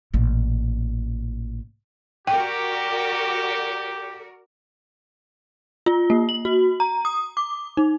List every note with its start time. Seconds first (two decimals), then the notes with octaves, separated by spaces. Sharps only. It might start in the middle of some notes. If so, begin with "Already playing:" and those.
0.14 A1 A#2
2.27 F#4 G4 A#4 D5 G5
5.86 F4
6.10 A#3
6.29 F#7
6.45 F#4
6.80 A#5
7.05 D#6
7.37 D6
7.77 D#4